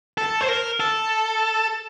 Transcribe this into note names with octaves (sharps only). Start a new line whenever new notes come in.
A4
C5
A#4
A4